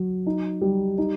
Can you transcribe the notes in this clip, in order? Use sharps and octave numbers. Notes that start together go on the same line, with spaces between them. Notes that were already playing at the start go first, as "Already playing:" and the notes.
Already playing: F#3
D#4
G3
D#4